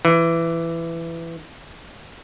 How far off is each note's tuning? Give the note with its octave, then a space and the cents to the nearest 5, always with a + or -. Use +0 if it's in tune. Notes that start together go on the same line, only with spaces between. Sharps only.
E3 +15